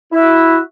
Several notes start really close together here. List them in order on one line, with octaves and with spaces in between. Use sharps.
E4 E5 F#4